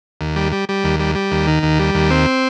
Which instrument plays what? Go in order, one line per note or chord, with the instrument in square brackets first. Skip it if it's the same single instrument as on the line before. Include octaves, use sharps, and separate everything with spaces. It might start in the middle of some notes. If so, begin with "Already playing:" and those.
[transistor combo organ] D#2
G3
G3
G3
D#2
G3
G3
D#2
D#3
D#2
G3
D#2
C4